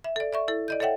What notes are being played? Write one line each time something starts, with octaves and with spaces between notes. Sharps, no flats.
E5
A4 D5
D5 E5 C#6
E4 A4
D5 D#5 G6
A4 C#5 E5 F#5 G5